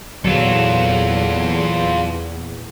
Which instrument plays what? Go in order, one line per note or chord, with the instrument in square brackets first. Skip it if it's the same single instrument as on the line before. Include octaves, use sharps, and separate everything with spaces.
[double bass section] E2 A#2 E3 [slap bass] F#3 [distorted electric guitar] F4 A4